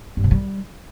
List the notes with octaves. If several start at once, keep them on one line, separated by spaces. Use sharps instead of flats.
G2
C3
G3